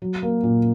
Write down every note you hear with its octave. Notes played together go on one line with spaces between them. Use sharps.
F#3
A#3
A#2